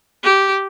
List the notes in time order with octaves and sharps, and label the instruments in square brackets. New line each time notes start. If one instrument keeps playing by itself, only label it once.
[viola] G4